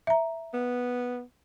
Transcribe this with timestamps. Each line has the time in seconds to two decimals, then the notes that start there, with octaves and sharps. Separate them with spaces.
0.07 E5 A#5
0.54 B3